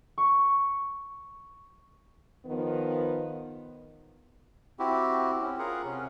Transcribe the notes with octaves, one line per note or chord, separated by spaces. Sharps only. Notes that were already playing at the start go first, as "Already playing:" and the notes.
C#6
D#3 F3 B3
C4 E4 F#4 G4
C4 C#4
F4 G#4 A#4 F#5
C3 C#4